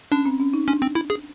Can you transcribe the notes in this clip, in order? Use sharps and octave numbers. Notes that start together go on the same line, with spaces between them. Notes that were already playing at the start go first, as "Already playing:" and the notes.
C#4 D4
C4
C#4
D#4
C#4 D4
C4
E4
G#4